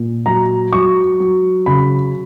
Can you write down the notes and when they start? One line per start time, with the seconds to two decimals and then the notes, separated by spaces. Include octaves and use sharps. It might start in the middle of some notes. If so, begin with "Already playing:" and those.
Already playing: A#2
0.26 F#3 A#5
0.73 F#3 C#6
1.20 F#3
1.66 C#3 B5